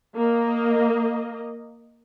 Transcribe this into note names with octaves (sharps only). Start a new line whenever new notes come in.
A#3 D#5